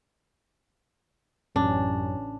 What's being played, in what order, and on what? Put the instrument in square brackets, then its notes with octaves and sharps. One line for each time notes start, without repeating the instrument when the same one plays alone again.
[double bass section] A1 [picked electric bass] F#2 [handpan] C#4 [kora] D4